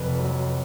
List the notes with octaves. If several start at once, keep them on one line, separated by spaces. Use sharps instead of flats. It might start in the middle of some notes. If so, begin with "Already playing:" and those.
Already playing: F1 B4
F#3